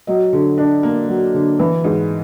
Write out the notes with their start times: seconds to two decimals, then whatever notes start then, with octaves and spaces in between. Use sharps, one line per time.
0.07 F#3 D#5
0.33 D3
0.58 D4
0.83 A#3
1.09 F#3
1.34 D3
1.59 E3
1.84 G#2